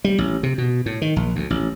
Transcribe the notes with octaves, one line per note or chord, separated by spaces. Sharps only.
G3
A1
C3
B2
A2
D#3
A#1
D2
A1